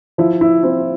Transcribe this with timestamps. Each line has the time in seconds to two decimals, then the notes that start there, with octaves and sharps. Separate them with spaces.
0.18 F3 E4
0.41 E4
0.63 C4 E4